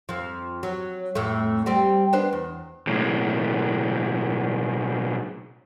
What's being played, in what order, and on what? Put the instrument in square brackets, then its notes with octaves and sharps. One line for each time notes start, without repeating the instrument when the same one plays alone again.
[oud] F2 F3
F#3
F2 A2 A3
G3 C4 G4
B3 D4 C5
E2
[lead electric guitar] B1 A2